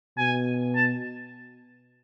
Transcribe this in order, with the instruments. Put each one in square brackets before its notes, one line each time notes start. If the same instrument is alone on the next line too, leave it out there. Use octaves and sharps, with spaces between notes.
[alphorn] B2 [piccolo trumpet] G#5
[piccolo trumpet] A5